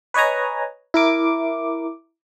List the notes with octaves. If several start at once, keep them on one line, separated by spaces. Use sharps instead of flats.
B4 C#5 D#5 G#5 A#5
E4 A#4 D6